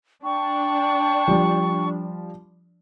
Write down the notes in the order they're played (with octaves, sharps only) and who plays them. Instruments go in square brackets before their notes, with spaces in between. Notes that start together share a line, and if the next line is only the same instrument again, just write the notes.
[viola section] D4 [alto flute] G5 [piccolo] C#6
[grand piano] F3 G3